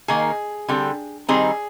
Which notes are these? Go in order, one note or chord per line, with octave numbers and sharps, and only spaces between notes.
D#3 A#3 D#4 G#4
D3 G3 C4
D#3 G3 C4 D#4 G#4